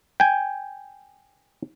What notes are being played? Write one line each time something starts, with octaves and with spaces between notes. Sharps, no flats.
G5 G#5